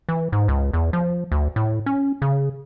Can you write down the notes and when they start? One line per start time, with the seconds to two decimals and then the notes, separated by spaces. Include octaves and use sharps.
0.09 E3
0.32 G#2
0.48 C#2
0.73 E2
0.93 F3
1.32 D2
1.56 A2
1.86 C#4
2.22 C#3